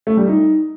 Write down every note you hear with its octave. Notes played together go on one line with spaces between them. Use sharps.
A3
G3
D#4